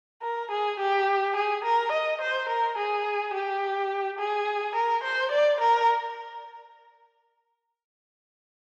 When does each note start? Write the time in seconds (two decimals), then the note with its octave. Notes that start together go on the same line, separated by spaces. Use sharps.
0.22 A#4
0.51 G#4
0.80 G4
1.36 G#4
1.64 A#4
1.92 D#5
2.21 C5
2.49 A#4
2.78 G#4
3.34 G4
4.19 G#4
4.75 A#4
5.04 C5
5.31 D5
5.60 A#4